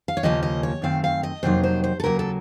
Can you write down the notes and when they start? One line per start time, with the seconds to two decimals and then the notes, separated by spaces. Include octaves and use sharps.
0.08 F5
0.17 C#5
0.23 D#2 C#3 F3 A#3 C#4 D#5
0.43 D#5
0.63 C#5
0.82 F#2 D#3 A3 C4 F5
1.04 F5
1.23 D#5
1.43 F2 C3 F#3 A#3 D#4 C5
1.63 C5
1.84 C5
2.00 A4
2.03 D#2 C#3 F#3 A#3 A#4
2.19 A4